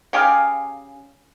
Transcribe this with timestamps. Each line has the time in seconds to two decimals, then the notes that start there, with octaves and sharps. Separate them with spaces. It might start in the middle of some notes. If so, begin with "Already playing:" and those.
0.13 C#3 G4 G#4 F5